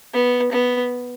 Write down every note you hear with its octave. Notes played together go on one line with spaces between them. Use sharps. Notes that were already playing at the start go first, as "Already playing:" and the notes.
B3
B3